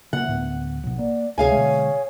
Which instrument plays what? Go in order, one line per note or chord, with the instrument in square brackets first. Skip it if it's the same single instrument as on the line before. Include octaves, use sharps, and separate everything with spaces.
[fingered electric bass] C#3 A#3 [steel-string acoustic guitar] F#5
[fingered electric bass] D2 A2 B3
A#1 B2
[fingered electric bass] A#3 [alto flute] D5
[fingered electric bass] C#2 C3 [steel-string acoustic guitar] G#4 F5 G#5 [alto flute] C#5
[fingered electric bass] B2 D3 G#3